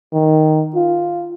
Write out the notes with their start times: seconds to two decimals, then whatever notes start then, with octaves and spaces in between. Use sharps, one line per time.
0.13 D#3
0.75 F4